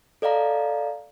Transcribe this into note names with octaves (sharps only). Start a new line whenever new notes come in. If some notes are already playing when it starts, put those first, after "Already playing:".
A4 D5 D#5 F5 A#5